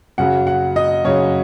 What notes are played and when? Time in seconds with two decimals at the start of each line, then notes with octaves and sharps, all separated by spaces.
0.18 F#2 C#3 F#3 F#5
0.47 F#5
0.76 D#5
1.05 F#2 C#3 F#3 C#5